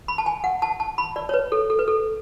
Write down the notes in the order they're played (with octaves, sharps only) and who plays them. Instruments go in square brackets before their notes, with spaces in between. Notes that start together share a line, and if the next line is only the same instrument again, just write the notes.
[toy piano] B5
A5
G#5
F#5
A5
A5
B5
D5
C#5
B4
A4
A4
B4
A4